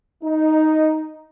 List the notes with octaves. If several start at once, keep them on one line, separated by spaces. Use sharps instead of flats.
D#4